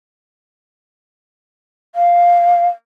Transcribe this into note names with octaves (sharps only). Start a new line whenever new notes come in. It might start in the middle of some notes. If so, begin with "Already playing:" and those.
F5